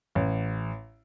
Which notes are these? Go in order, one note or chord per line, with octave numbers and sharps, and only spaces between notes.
A1